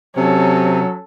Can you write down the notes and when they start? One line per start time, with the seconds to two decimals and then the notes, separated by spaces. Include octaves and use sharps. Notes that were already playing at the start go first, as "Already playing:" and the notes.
0.16 C3 F#3 C#4 A4